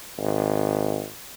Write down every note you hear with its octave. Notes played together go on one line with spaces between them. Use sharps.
G#1